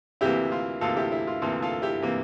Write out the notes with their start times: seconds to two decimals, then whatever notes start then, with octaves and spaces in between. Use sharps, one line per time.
0.21 D2 C3 E3 A#3 E4 G4
0.52 F4
0.81 D2 C3 E3 A#3 F4 A4
0.97 E4 G4
1.12 E4
1.27 F4
1.42 D2 C3 E3 A#3 F4 A4
1.62 F4 A4
1.82 E4 G4
2.02 C3 E3 A#3